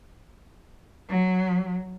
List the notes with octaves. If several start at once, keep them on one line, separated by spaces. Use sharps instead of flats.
F#3